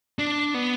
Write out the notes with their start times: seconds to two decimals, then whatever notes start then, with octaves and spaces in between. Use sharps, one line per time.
0.19 D4
0.54 B3